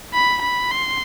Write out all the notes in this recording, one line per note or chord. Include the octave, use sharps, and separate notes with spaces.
B5
B5
C6